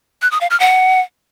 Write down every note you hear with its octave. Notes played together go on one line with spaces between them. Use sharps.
F#6
D#6
F5
F6
F#5